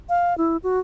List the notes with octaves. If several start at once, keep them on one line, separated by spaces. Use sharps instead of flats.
F5
E4
F#4